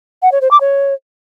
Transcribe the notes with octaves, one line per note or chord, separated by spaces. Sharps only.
F#5
C#5
C5
D6
C#5